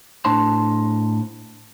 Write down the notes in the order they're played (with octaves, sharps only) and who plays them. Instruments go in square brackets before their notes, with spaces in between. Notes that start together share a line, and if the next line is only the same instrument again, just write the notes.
[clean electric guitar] A2 D4 C5 A5 C6